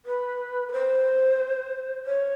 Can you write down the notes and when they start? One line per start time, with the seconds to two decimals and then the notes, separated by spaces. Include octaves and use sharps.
0.06 B4
0.68 B4
0.72 C5
2.06 C#5